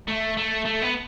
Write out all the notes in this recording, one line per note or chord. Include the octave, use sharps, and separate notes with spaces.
A3
A3
A3
B3